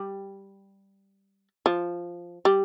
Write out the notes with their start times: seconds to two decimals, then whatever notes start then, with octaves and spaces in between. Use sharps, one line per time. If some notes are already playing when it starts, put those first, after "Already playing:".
Already playing: G3
1.66 F3
2.45 G3